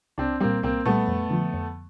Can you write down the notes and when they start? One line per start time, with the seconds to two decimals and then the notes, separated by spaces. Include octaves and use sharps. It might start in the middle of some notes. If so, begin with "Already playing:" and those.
0.18 C2 C4 D4
0.40 A#2 G3 A#3 C4
0.63 C2 A#3 C4
0.85 A#2 G3 A3 B3
1.08 F2
1.30 D3 F3
1.54 F2